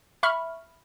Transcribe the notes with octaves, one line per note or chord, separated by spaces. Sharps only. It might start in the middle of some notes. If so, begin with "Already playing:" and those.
E5 B5 C#6 F6